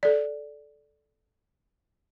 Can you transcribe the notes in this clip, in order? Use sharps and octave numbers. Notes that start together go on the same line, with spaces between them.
A4 D5